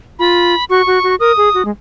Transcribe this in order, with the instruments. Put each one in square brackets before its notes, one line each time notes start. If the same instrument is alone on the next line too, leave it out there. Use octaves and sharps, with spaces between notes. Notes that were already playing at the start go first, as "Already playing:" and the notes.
[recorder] F4 [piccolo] B5
[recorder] F#4 [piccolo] C#6
[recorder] F#4
F#4
[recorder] A#4 [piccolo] D#6
[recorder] G#4
F#4
G#3